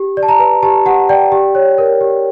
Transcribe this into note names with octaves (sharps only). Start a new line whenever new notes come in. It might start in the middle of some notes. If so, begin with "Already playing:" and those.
Already playing: G4
D5
A5
A#5
B4
G4 A5
G4 F#5
D5 G5
G4
C#5
A#4
G4